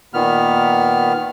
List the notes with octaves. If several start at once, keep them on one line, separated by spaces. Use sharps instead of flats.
A#2 D#3 B3 F6